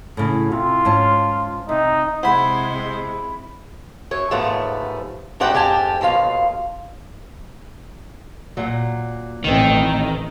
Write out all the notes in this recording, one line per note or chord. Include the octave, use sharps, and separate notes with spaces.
A2 C#3
C3 F4
G#2 C#4 A5
C3 D#4
C3 G#3 E4 C5 F#5 B5
F#2 C#5
D#2 G#2 F3 A3 B3
G2 G#3 F#4 D5 F#5 G5
F2 G#2 G4 G#5 A5
D#2 B2 F4 F5
A#2 F#3
A1 B2 D#3 C4